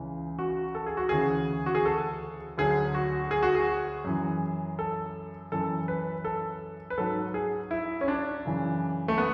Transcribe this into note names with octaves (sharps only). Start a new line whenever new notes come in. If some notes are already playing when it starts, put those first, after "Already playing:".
Already playing: C#2 C#3 E3
F#4
A4
G#4
F#4
D2 C#3 E3 G#4
F#4
G#4
A4
D2 D3 F#3 G#4
F#4
G#4
F#4
G#4
F#2 E3
A4
F#2 E3 A4
B4
A4
B4
G#2 F#3 A4
G#4
E4
C#4
D4
F#2 C#3 E3
A3
B3